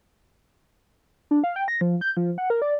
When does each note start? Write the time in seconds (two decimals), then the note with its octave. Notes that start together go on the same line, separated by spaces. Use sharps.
1.31 D4
1.44 F5
1.56 G5
1.68 A#6
1.81 F3
2.01 G6
2.17 F3
2.38 F#5
2.50 A#4
2.62 D5